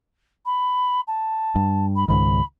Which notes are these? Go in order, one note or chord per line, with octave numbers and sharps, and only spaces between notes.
B5
A5
G2
B5
C#2 G#2 D#3 B5